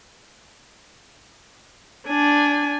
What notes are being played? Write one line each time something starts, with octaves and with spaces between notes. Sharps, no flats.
D4 G#5